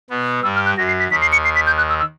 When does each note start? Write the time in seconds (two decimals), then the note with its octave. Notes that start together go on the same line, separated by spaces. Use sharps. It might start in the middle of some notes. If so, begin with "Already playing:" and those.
0.10 B2 B3
0.43 G2 G3 E6
0.55 F6
0.66 F#6
0.77 F#2 F#3 A#6
0.88 C7
0.99 B6
1.10 D#2 D#3 B6
1.22 C7
1.32 C#7
1.45 C7
1.55 B6
1.67 G6
1.78 F#6
1.89 E6
2.00 E6